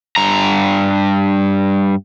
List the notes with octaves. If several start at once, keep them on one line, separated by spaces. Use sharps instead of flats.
G2 A#5